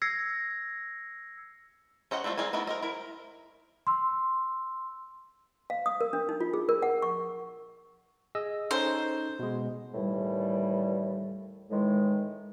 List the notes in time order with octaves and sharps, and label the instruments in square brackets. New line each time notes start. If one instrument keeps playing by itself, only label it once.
[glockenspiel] E6 G#6 A#6 C7 C#7
[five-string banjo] C#4 C5 D#5 F#5
G3 A3 C4 D4 F4
C4 G#4 A#4 D5 G#5
A3 B3 D#4 E4 D#5
A#4 C5 D#5
E4 A#4
[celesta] C6 E6
[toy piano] F5
D#6
A#4
D4
D#4
F4
G#4
A#4
F#5
C#6
[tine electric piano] G#4 D#5 E6
[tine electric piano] C#4 D#4 A4 [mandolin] C5
[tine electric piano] B2 G#3
[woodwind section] D#2 A2 E3 G3
A2 D#3 E3 G#3